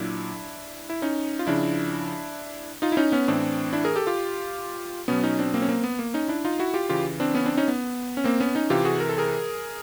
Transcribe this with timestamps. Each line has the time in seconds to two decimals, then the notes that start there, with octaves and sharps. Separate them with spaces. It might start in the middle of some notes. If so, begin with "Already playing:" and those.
Already playing: A#2 F#3 D4 E4
0.90 E4
1.02 C#4 D#4
1.39 F4
1.47 C#3 F3 D4 E4
2.82 D#4 F4
2.92 E4
2.97 C#4 D#4
3.12 B3 C#4
3.28 A2 E3 C4 D4
3.73 D4 E4
3.85 G#4 A#4
3.96 G4 A4
4.07 F4 G4
5.08 B2 F#3 B3 C#4
5.23 C#4 D#4
5.39 C4 D4
5.54 A#3 C4
5.62 C#4
5.69 A#3 C4
5.84 B3
5.99 A#3
6.14 C#4 D#4
6.28 D4 E4
6.45 D#4 F4
6.59 E4 F#4
6.74 F4 G4
6.89 C#3 E3 F4 G4
7.20 C4 D4
7.35 B3 C#4
7.46 C4 D4
7.57 C#4 D#4
7.68 B3
8.17 C#4
8.24 A#3 C4
8.40 B3 C#4
8.55 C#4 D#4
8.70 C3 E3 F4 G4
8.85 F#4 G#4
9.00 A#4
9.09 A4
9.18 G#4 A#4